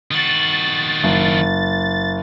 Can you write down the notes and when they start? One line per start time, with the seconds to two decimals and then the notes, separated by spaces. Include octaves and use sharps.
0.11 D#3 F#4 A6
1.04 F#1